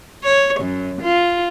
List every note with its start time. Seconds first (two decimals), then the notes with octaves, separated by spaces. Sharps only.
0.24 C#5
0.60 F#2
1.02 F4